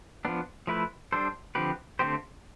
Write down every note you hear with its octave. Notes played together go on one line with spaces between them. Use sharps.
F3 B3 D4
F3 A3 E4 B4
G3 D4 A4 C5
D3 F3 C4 G4 B4
D3 A3 C4 G4 C5